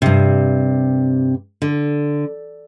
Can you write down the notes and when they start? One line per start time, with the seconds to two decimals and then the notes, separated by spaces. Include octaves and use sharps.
0.02 G2 C3
1.62 D3